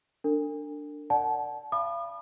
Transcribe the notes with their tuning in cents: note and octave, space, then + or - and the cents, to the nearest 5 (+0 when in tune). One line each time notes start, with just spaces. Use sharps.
D4 +5 A#4 -45
D5 +0 F#5 +10 A5 -30
F5 -40 B5 -10 D#6 -45